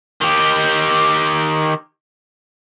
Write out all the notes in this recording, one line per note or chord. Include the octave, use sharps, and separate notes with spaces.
D#3 G4